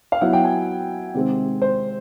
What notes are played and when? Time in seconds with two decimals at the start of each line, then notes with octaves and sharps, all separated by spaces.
0.12 F5
0.21 F#3 B3 E4 F#5
0.33 G5
0.44 G#5
1.14 C3 D#3 G#3 C4
1.62 C5